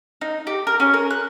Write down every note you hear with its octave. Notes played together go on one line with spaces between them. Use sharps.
D#4
G4
A#4
C#4
A#4
F#6